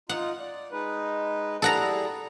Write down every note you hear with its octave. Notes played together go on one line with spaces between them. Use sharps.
D#4 F4 F#5
D5
G#3 D#4 B4
G3 E4 G#4 A4 F#5 A#5